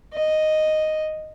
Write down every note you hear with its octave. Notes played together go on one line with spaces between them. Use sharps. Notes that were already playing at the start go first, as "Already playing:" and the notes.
D#5